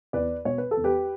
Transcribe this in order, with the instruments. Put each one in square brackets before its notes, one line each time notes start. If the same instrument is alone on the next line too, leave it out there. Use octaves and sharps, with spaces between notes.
[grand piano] E2 B4 D5
B2 C#5
B4
A4
E2
G4 B4